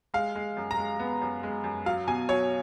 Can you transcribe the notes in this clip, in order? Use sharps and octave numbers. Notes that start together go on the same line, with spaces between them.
G#3 F5
G#3
F#2
A#5
G#3
B3
F#2
G#3
F#2
F#3 F5
B2 G#5
F#3 C#5